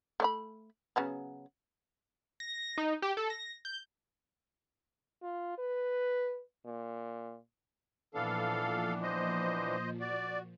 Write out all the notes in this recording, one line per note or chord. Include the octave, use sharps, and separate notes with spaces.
A3 D5 B5
C#3 F#3 B3
A#6
D#4
G4
A4
A#6
G6
F4
B4
A#2
A#2 E3 F3 B3 D4 A4 F5
C5 D#5
F#4 D5